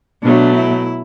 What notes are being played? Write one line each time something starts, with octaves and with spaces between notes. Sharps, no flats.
B2 F#3 A3 D4
E4